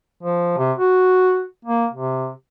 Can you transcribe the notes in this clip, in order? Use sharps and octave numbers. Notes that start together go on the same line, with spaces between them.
F3
C3
F#4
A#3
C3